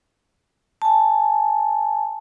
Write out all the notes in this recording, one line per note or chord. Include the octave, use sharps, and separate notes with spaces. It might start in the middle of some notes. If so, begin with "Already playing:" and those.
G#5 A5